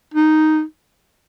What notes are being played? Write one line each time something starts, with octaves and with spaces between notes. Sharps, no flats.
D#4